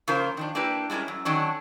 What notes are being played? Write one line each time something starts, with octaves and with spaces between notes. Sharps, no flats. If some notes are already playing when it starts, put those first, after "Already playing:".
C#3 F3 A#3 F4 A#4 C5
D#3 F3 D4
A#3 D4 E4 G4 B4
G3 G#3 C#4 E4 A#4
F#2
D3 D#3 F#3 C#4 D4